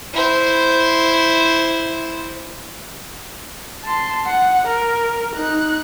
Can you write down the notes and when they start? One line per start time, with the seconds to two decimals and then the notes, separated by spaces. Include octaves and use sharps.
0.13 E4 C5
3.83 A5 C6
4.27 F#5
4.67 A#4
5.36 D#4 F#6